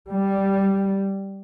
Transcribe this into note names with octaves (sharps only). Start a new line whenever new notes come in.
G3